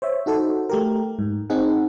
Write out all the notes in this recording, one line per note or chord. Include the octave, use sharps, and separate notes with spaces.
C5 C#5 E5
D#4 F#4 A4 C5
A3 G4 A#4
G#2
C4 D#4 G#4 F#5